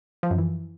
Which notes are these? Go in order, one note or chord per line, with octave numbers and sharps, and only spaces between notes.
F3
F#2
E3